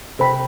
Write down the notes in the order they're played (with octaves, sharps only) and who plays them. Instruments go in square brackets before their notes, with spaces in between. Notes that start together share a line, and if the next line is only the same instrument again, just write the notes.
[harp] C3 C4 [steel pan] A4 C5 G5 B5